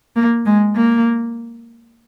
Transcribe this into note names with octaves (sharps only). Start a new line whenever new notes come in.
A#3
G#3
A#3